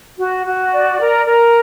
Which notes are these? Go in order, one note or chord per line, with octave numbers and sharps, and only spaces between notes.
F#4
F#4
D5
A#4
A#4